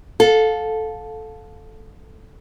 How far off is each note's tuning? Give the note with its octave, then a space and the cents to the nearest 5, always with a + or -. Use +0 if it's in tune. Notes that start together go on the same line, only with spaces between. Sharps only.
A4 -10 F5 +30